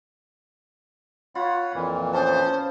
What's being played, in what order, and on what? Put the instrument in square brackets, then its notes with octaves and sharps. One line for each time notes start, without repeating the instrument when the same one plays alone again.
[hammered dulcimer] F4 [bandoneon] C#5 F#5 B5
[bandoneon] F2 A#2 E3
[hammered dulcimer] B3 C#4 A5 [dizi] C5